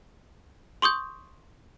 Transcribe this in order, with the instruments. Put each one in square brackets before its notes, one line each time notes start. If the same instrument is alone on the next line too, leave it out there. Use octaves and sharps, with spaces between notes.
[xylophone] C6 C#6 D#6 G6